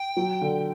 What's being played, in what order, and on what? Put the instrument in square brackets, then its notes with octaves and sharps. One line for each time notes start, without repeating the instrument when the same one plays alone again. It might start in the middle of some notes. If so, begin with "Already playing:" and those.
Already playing: [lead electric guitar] G5
[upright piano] F#3
D3